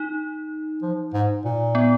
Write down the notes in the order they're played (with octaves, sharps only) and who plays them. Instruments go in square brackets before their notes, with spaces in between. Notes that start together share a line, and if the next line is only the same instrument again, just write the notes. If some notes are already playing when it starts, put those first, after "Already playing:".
Already playing: [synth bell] D#4
[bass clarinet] F3
G#2
A#2
[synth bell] B3